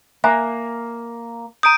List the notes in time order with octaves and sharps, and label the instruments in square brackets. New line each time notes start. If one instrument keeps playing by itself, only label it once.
[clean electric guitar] A#3 [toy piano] E5 G#5 A#5 [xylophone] F#6
[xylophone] A#5 D#6 [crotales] G6 D7 D#7